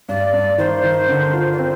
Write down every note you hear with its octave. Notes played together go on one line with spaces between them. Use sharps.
G2 D5
G2
D#3 C5
D#3
D3
F4
D5
C4 C5